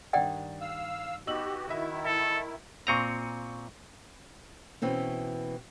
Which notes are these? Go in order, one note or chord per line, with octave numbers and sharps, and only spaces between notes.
G2 D#3 D5 F#5 G5 A6
F5 E6
B3 D#4 F#4 G4 E6 F#7
D#3 E4 F#4 D#5 E5
A4 E5
A#2 C4 A#5 C#6 C#7 D#7
B2 E3 C4 C#4